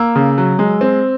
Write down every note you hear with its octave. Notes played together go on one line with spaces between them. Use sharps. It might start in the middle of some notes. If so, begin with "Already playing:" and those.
Already playing: A#3 E6
C#3
F#3
G#3
C4